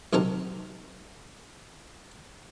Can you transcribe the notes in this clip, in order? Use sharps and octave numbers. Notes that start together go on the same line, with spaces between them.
B1 C3 D#3 A4 A#4